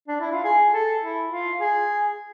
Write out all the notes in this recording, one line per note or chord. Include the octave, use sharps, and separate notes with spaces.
D4
E4
F4
G#4
A4
E4
F4
G#4